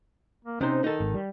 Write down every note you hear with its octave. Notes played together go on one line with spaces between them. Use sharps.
A#3
C3 C#4 D#4 C5
D#3 D#4 A4
G#1
G3